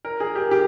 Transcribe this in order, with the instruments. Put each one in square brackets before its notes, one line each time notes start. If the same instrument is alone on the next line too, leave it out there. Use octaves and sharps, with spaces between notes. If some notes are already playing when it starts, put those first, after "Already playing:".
[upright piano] A#4
G#4
G4
G4